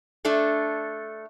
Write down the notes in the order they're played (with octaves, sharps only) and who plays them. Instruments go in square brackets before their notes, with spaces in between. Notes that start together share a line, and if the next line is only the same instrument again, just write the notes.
[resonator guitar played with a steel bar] A3 D4 A4